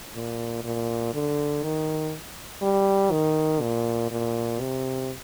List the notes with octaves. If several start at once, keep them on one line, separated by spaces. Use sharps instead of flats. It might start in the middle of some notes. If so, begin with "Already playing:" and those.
A#2
A#2
D3
D#3
G3
D#3
A#2
A#2
C3